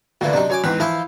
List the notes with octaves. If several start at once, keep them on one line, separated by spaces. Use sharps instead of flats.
D2 A#2 D3 E3
F#2 C3 D4 D#4
F#2 C#5 G#5 D6
E2 G#2 C4 B4
E3 F3 E4 F4